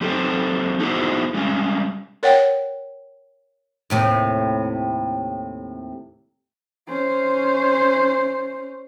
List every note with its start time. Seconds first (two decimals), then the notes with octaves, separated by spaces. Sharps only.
0.01 F#3 C4 G4 A4 C5
0.79 B3 D#4 E4 F#4 G#4 C5
1.34 G3 G#3 C#4
2.23 A#4 C#5 F#5 G5
3.90 D#2 A2 C3
6.88 C#4 C5